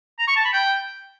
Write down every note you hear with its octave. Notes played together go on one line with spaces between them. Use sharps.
A#5
C#6
A5
B5
G5